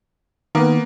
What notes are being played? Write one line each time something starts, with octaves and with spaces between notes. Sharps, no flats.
D#3 A#3 B3